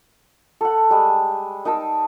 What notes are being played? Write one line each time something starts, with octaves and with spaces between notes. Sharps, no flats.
A4 F#5
G3 G#3
D#4 A#4 A5 E6